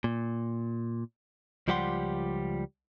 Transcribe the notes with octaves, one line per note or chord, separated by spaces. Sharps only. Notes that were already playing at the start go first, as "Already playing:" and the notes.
A#2
C#2 F3 G3 G4 F#5 C6